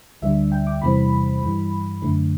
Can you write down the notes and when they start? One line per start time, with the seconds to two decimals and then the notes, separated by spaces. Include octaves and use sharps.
0.22 D2 D3 G3 D4 E5
0.52 G5
0.67 D6
0.82 E2 C3 E3 G3 C4 B5
1.42 G2 E3 G3
2.02 F#2 D3 A3